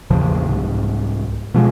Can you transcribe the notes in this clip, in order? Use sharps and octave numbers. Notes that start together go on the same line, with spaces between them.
A1 E2 C#3 F3
C2 G#2
B2 F3 G#3